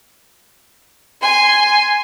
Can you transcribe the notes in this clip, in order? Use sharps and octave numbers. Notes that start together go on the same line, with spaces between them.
G#5 C6